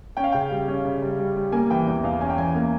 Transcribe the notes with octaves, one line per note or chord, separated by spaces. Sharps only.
C#4 G5
F5
C#3 G5
G3
C#4
C#3
G3
G3
G3
A#3 G#5
E3 G5
E2
E2 F5
C#4 G#5
G5
E3 G#5
A#3